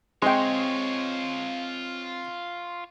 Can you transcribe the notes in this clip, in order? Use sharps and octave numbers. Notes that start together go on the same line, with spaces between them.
G#3 C4 F4 C#5 D#5 G5 C6